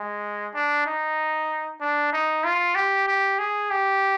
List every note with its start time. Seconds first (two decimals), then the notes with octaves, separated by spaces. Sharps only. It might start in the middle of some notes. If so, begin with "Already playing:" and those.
Already playing: G#3
0.54 D4
0.86 D#4
1.81 D4
2.12 D#4
2.44 F4
2.75 G4
3.08 G4
3.39 G#4
3.71 G4